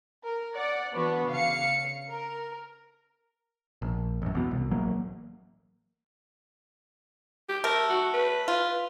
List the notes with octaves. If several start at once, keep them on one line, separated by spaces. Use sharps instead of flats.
A#4
D5 F#5
E3 B3 D4 F#4 B4
C#3 F5 C#7
A#4
A#1
A1 F#2
E2 B2
C2
A1 F#3 A#3
G4
A3 A#4
F#4
B4
F4